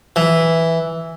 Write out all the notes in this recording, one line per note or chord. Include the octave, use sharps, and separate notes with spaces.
E3